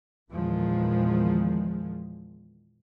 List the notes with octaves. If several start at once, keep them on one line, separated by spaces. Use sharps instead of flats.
E2 A#2 D#3 F3 G#3